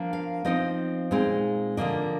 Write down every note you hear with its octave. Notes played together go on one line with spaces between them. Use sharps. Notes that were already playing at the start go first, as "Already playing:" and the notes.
Already playing: F3 A#3 D4
F5
F3 C4 D#4 D#5
A#2 G#3 C4 D#4
D3 F3 A#3 D4 D#5